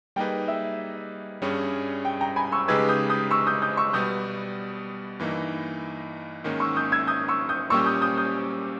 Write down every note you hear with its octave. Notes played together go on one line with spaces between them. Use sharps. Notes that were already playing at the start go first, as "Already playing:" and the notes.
G3 A#3 D#4 G#4 B4 G5
E5
G2 G3 C#4 G#4 C#5
G5
G5 A#5
G#5 B5
C#6 E6
C#3 G#3 D#4 G4 B4 E6 G#6
D#6 G6
D#6 G6
C#6 E6
D#6 G6
D#6 G6
C#6 E6
B2 G3 B3 D#6 G6
G2 E3 A#3 D#4
G#2 D#3 A#3 C#4
C#6 E6
D#6 G6
E6 G#6
D#6 G6
C#6 E6
D#6 G6
A#2 G3 A#3 C#4 G4 C#6 E6
D#6 G6
D#6 G6
D#6 G6